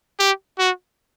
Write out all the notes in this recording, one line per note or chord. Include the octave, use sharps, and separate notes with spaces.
G4
F#4